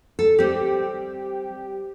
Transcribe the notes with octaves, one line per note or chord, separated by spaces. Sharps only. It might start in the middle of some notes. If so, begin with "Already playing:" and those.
A4
G3 C4 G4